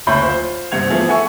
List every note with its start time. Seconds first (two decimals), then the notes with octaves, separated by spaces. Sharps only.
0.07 F#1 D2 E4 C#5 B5 G6
0.23 F4 C5
0.71 C2 G2 C4 F#5 G#6 F7
0.90 E3 F3 A3 B3 G#4
1.09 E4 A4 E5 F#5 G#5 C#6